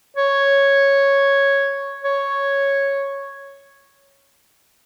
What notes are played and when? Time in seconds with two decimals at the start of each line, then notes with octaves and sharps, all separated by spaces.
0.17 C#5
2.05 C#5